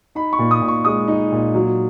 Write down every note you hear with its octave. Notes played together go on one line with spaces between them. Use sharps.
D#4 B5
C#6
A#2
D#6
A#2
C#6
G#3 D#6
D#4
A#2
F#3